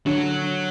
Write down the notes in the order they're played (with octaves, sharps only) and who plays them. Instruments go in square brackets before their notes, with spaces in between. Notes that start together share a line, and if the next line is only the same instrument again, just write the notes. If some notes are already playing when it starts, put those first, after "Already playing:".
[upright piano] D3 [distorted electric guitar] F#3